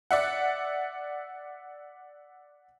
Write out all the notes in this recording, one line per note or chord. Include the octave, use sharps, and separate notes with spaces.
D5 E5 F#5